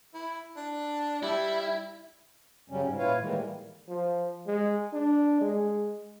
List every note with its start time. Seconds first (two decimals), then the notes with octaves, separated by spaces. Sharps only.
0.14 E4
0.57 D4
1.23 G3 E4
2.70 F#2 C#3 F#3 G3 C#4
2.83 G#2
2.97 A#2 E4 F4 B4 C#5 F5
3.20 A2 D#3 E3 G3 G#3 A#3
3.89 F3
4.47 G#3
4.93 D4
5.41 G#3